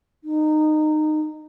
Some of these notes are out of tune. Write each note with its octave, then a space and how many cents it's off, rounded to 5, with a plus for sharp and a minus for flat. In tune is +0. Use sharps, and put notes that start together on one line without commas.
D#4 -20